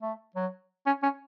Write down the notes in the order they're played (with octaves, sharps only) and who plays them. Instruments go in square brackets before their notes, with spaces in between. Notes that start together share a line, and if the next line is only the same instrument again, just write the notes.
[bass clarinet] A3
F#3
C#4
C#4